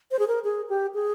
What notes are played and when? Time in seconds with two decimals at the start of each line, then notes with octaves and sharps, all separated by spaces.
0.11 C5
0.19 G#4
0.28 A#4
0.44 G#4
0.69 G4
0.94 G#4